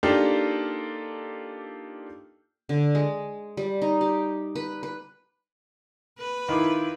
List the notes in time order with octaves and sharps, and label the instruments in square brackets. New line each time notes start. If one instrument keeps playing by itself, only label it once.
[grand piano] A#3 D4 D#4 F4 G4 A4
[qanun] D3
G#3
G3
D#4
G4
B4
B4
[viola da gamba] B4
[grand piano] D#3 F4 [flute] E4 [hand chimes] F5 B5 D6